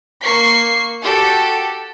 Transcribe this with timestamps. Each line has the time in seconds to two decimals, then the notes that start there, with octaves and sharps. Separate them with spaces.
0.23 A#3 C#6 C7
1.03 F#4 G4 A4